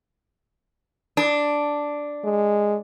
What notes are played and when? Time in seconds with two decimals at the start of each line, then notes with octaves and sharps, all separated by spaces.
1.17 D4
2.24 G#3